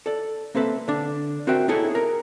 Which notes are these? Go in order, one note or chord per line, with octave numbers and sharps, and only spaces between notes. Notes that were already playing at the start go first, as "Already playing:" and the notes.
A4 D5
A#3 C4 A4 B4 E5
D3 D4
C4 F#4 A#4 E5 G5
B3 D#4 E4 G#4 A4 C#5
G#4 A#4